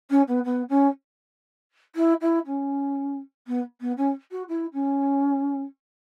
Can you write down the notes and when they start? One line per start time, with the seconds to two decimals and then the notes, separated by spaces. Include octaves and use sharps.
0.10 C#4
0.27 B3
0.44 B3
0.69 C#4
1.95 E4
2.21 E4
2.46 C#4
3.47 B3
3.80 B3
3.97 C#4
4.31 F#4
4.48 E4
4.73 C#4